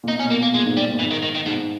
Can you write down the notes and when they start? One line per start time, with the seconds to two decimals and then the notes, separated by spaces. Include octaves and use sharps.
0.03 A#2
0.08 B2 D#4
0.20 C#4
0.24 A#2
0.31 B2 A#3
0.43 A#3
0.54 A#2 G#3
0.65 G#2
0.76 G#2 G3
0.88 A#2
0.99 G#2 E3
1.11 D#3
1.23 D#3
1.35 D#3
1.46 G#2 B2